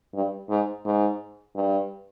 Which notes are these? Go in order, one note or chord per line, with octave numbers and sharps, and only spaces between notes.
G2
G#2
G#2
G2